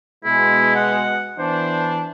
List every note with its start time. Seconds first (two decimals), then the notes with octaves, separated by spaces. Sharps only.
0.25 B2 G#3 E4
0.76 F#5
1.38 E3 B3 D4 C5